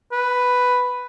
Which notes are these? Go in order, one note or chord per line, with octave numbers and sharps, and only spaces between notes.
B4